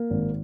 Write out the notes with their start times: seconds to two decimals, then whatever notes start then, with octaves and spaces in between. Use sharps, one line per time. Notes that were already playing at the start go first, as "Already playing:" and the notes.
Already playing: A#3
0.10 G#1